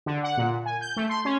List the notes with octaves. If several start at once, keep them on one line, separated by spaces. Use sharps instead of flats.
D3
F#5
A#2
G#5
G6
A3
C6
C#4